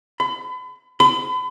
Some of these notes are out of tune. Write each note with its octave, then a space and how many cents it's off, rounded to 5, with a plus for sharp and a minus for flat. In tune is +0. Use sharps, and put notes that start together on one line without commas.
B5 +35
B5 +40